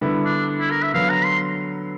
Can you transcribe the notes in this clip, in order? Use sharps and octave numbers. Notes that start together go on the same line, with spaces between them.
D3 G3 B3 E4
D4
E4
A#4
E5
D3 F#3 B3 F5
A#5
C6